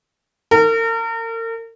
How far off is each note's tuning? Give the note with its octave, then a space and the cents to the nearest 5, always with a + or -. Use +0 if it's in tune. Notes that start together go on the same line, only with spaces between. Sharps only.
A#4 -40